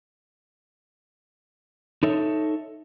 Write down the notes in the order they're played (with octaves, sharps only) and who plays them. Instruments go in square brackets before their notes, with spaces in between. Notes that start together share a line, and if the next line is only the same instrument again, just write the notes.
[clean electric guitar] D#4 A4 C#5 E5